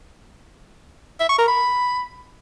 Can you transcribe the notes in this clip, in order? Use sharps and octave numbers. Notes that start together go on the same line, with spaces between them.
E5
C#6
A#4
B5